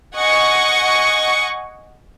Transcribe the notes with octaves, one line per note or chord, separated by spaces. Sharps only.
D#5 F#5 G#5 C#6